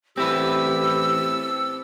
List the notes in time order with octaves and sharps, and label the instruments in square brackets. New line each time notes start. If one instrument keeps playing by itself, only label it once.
[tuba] A1 [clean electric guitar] C4 E4 B4 [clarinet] G4 [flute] E6